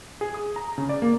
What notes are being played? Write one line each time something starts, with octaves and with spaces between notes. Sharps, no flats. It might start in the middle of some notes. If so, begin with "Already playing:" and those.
G#4
D#6
A#5
C#3
D5
A#3